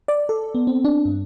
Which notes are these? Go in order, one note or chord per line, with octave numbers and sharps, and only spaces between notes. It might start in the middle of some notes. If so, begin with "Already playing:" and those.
D5
A4
B3
C4
D4
G2